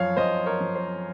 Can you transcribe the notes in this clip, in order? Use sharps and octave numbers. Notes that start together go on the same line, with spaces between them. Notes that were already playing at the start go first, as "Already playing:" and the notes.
Already playing: F#2 F3 C#5 F5
F#2 C5 D#5
A#4 C#5
F3
C5